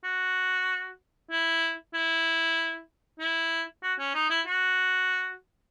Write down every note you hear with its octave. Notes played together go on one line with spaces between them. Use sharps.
F#4
E4
E4
E4
F#4
C#4
D#4
E4
F#4